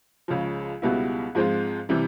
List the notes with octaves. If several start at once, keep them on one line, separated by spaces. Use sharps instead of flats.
C#2 C#3 F3
C#2 B2 G3 B3 E4
G#2 F3 G#3 C4 F4
C3 E3 G3